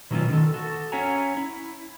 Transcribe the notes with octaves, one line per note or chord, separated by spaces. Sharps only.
B2 D#3 F#3 A3 C#4 F4
D#3 A4
F#4 A4
C#4 C#5 E5 F#5 G#5 A#5
E4